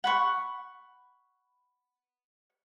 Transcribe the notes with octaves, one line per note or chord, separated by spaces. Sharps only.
F#5 B5 C#6